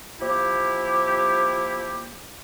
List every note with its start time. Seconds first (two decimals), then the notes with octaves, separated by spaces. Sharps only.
0.21 F3 A#3 E4 G4